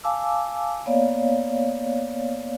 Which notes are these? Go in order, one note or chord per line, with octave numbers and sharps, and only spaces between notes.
F5 G#5 A5 D6 E6
A#3 B3 C#5 D5 F5